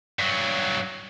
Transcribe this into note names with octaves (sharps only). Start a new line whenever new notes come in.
G2 F#3